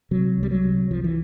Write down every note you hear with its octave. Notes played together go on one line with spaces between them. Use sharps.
C3 F#3
C2
G3
F#3
C3
C2 F3
E3